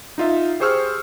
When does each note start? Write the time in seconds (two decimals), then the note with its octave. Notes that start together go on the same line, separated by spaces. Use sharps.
0.18 D#4 F4 E5
0.60 G4 G#4 C5 C#6 E6 F6